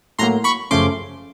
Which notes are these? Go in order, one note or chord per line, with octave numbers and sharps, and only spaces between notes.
A2 F#3 A#3 A#5 C6
B5 C#6
F#2 C#3 F3 A3 C#4 C6 D6